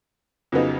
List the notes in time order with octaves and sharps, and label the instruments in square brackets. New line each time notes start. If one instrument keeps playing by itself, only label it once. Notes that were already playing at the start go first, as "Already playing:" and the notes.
[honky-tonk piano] F2 C#3 F#3 B3 D#4